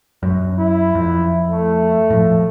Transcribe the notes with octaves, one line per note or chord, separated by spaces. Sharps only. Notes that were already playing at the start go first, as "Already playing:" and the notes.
F#2
E4
F2
A3
A2 F3